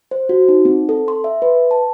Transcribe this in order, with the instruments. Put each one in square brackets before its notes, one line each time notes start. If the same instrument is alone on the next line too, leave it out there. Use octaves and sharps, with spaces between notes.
[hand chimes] C5
F#4
D#4
C4
A4
C6
E5
B4
A5